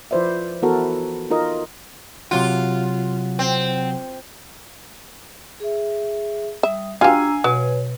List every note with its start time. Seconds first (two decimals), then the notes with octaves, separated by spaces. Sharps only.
0.11 F3 E4 B4 C5 D5 E5
0.62 E3 B3 E4 F#4 A4 A#4
1.30 D#4 F4 A#4 D#5
2.31 C3 F#3 F4 F#5
3.39 C4
5.60 G#4 E5
6.63 G3 E5 D#6
7.01 D4 F4 G4 F5 G#5 A#5 E6
7.44 B2 F#3 B4 C#5